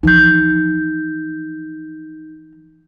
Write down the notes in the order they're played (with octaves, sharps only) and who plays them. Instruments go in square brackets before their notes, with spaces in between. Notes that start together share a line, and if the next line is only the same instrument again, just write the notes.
[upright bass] E3 F3 [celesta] D#4 G6